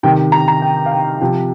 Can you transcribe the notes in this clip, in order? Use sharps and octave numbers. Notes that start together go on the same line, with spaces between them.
C3 D#3 G5
A#5
A#5
G5
F5
G5
C3 F3